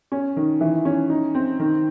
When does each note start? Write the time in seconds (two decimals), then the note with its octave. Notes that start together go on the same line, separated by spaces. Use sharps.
0.12 C#4
0.37 D#3
0.61 E3
0.85 C#4
1.10 D#4
1.35 C4
1.59 D#3